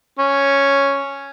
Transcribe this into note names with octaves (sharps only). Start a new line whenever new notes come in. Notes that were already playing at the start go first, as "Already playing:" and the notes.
C#4